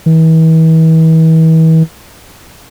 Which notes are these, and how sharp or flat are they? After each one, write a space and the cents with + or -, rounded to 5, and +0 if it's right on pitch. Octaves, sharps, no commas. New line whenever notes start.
E3 -40